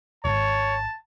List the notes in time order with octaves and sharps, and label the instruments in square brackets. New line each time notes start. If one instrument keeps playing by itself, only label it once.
[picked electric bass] D#1 G#1 [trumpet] C#5 [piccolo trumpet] A5